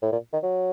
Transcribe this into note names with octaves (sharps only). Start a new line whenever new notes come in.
A2
A#2
D#3
F#3